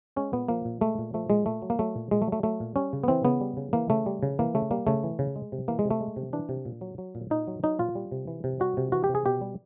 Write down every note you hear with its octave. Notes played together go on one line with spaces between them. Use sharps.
G#3 C#4
A#2 B3
F3 A#3
A#2
G#3 A3
A#2
F3 A3
A#2 G#3
A#2 A3
F#3
A#3
F#3 A3
A#2
A#2 G#3
A3
F#3
A3
F#3 A3
A#2
G3 C#4
C#3
B3
E3 C4
C#3 B3
G3
C#3
E3 A#3
C#3 A3
G3
C#3
E3 A#3
C#3 A3
G3 A#3
C#3 A3
E3
C#3
G#3
C3
E3 A#3
G#3
C3
A3
G#3
C3
E3 D4
C3
A#2
F#3
F#3
A#2
A#2 D#4
F#3
F#3 D#4
A#2 F4
G3
C3
E3
C3
G3 F#4
C3
E3 F#4
G4
C3
G#4
B2 G4
G3